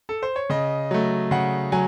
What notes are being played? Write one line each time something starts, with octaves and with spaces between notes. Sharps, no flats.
A4
C5
C#5
C#3 D#5
F#3 A3
C#3 F#5
F#3 G#5